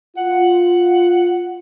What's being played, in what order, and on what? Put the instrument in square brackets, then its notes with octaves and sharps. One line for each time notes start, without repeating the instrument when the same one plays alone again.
[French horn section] F4 [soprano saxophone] F#5